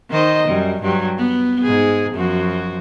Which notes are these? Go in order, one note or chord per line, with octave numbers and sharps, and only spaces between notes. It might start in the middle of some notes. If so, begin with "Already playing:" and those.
D#3 C5 D#5
F#2 G3
G2 F#3 G4
B3
G#2 G#4
F#2 F3 F#4